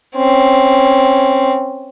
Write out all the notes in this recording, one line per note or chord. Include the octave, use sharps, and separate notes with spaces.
C4 C#4